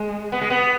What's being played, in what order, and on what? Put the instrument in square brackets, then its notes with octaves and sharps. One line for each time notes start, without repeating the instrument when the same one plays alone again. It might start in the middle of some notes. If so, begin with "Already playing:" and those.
Already playing: [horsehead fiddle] G#3
[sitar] B3
G#3
B3